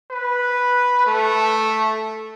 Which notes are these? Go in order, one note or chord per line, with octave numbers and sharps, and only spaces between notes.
B4
A3